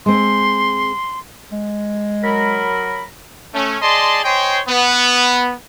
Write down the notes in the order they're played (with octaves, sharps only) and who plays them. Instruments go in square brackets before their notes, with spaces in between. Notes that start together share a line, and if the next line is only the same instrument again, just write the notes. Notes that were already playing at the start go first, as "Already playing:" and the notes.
[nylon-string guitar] G#3 C4 [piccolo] C6
[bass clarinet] G#3
[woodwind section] F#3 A#4 B5
[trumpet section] A3 C#4
G#4 D5 D#5 A5 C6
C5 C#5 D#5 G5 G#5 C6
B3